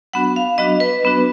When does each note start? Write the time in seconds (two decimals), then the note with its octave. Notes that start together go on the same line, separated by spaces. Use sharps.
0.13 F#3 B3 D4 F#4 F#5
0.36 F5
0.58 F#3 B3 D4 F#4 D#5
0.80 B4
1.03 F#3 B3 D4 F#4